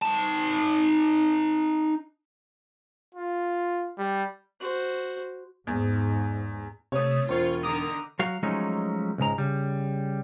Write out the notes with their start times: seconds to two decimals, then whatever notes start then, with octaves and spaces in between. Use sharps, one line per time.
0.02 D#4 A5
3.15 F4
3.98 G3
4.60 F#4 C5
5.67 E2 G#2
6.92 C3 A3 C#5 D#6
7.29 E1 F4 C5 C#6 G#6
7.63 D3 D#3 A#5 D6 D#6
8.19 F#3 F#4 F5
8.43 F3 F#3 G#3 A3 C#4 D#4
9.18 C#2 G#2 G#3 A#5
9.38 C#3 G3